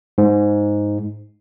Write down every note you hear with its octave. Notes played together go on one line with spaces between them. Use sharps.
G#2